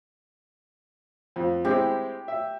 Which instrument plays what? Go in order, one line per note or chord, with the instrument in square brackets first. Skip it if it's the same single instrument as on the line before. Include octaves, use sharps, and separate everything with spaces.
[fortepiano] F2
[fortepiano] G#3 C4 E4 [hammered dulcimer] G4
[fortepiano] E5